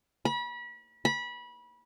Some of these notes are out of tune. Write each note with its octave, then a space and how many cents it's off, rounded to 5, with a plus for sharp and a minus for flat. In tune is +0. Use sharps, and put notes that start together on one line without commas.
B5 -35
B5 -25